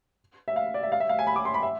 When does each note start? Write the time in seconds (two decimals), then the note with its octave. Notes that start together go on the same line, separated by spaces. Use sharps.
0.48 E5
0.56 F5
0.74 D5
0.83 E5
0.92 F5
1.00 E5
1.09 F5
1.19 G#5
1.27 B5
1.36 D6
1.45 C6
1.54 B5
1.63 E5